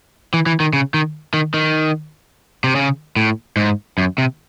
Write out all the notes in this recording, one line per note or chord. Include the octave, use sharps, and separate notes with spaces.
E3
E3
D#3
C#3
D#3
D#3
D#3
C3
C#3
A2
G#2
F#2
C3